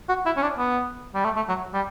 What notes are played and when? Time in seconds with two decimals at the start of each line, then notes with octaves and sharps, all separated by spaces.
0.09 F#4
0.26 E4
0.37 C#4
0.43 D4
0.58 B3
1.15 G3
1.25 A3
1.36 A3
1.49 F#3
1.74 G3